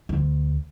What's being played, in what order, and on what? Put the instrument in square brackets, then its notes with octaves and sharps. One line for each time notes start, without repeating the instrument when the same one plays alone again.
[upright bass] D2